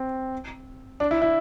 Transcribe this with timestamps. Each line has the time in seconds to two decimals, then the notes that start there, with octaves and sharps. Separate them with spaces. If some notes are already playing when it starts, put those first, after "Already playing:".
Already playing: C4
1.00 D4
1.11 E4
1.22 E4